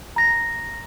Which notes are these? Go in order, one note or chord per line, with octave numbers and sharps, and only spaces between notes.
A#5 A#6